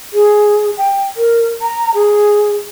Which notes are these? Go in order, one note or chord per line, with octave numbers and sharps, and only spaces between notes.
G#4
G5
A#4
A#5
G#4